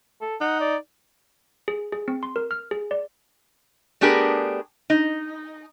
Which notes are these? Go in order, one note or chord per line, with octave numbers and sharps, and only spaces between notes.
A4
D#4 F#5
D5
G#4
G#4
C4
C6
A#4
F6
G#4
D5
A3 B3 D4 G4 G#4 A#4
D#4